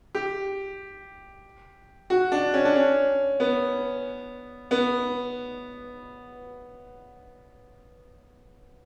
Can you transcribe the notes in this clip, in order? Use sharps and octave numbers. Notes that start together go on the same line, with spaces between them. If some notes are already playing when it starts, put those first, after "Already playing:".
G4
F#4
D4
C#4
D4
C#4
B3
B3